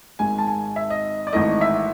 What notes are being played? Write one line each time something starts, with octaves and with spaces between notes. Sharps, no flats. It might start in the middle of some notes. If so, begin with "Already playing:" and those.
G#1 G#2 D#3 G#3 G#5
A5
G#5
E5
D#5
D5
G#1 G#2 E3 A3 D#5
E5